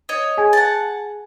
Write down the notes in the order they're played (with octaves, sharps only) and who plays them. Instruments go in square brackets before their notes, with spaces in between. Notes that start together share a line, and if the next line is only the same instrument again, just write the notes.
[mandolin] C#5 D#5
[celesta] G#4 G#5 G#6
[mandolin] F#5 A5